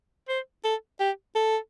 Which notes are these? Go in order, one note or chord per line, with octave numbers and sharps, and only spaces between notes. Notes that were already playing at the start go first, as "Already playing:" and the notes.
C5
A4
G4
A4